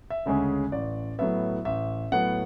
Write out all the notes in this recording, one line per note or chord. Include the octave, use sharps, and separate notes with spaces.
E5
D2 C#3 G#3 C#4
A1 D5
A2 F#3 B3 E5
A1 E5
A2 F#3 B3 F#5